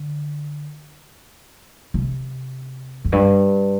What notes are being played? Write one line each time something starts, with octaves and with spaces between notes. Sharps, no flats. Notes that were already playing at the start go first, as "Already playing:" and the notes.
Already playing: D3
C3
F2
G2